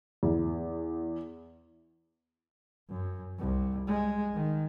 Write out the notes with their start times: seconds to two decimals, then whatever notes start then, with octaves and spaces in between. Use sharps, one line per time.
0.23 E2
2.89 F#2
3.39 C2
3.87 G#3
4.34 D#3